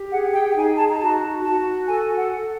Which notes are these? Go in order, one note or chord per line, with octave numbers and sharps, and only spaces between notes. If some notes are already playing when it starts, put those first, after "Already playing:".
Already playing: G4
G#4 F#5
G5
G5
D#4 G#5
A5
A#5
F#4 A5
F#4 A5
A4 G#5
F#5
A4